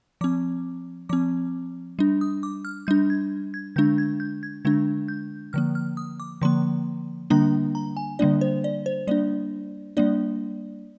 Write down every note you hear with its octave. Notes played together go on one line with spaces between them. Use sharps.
F3 C4 D6
F3 C4 D6
G3 D4
D#6
D6
F6
G3 D4 G6
G#6
G#6
D3 G#3 D4 G6
G#6
G6
G#6
D3 G#3 D4 G#6
G6
D3 F3 A#3 F6
F6
D#6
D6
D3 F3 A#3 C6
D3 G3 A#3 D4 A#5
A#5
G#5
D3 G3 A#3 D4 D5
C5
D5
C5
G3 A#3 D4 D5
G3 A#3 D4 D5